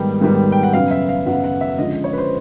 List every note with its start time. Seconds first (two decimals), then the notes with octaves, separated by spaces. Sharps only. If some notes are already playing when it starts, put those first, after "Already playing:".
Already playing: G#2 D#3 G3 B3
0.21 G#2 D#3 G3 B3
0.52 G5
0.63 F#5
0.73 F#2 C#3 F#3 B3 F5
0.91 E5
1.09 F5
1.26 F#2 C#3 F#3 B3 F#5
1.44 F#5
1.61 E5
1.78 D3 F3 G#3 C#4 D#5
1.92 D#5
2.04 C#5
2.13 B4
2.18 C5